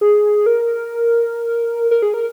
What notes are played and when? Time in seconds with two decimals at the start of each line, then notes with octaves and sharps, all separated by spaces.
0.01 G#4
0.46 A#4
1.91 A#4
2.02 G#4
2.14 A#4